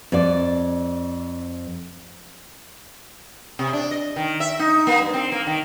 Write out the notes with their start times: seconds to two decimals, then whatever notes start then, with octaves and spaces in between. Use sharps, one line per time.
0.12 F2 D5
3.59 C3
3.73 D4
3.91 D#5
4.16 D#3
4.40 E5
4.59 D#4
4.87 A#3
5.01 G2
5.14 C4
5.32 A#3
5.47 D#3